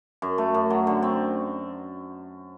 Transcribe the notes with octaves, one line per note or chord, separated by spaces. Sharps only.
F#2
A3
F#2
F#3
D3
C4